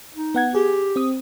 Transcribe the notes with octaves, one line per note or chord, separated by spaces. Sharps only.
D#4
B3 F#5 G#6
G4 G#4
C4 D#6